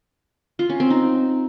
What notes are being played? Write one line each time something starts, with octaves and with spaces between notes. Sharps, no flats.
F4
C#4
C4
D#4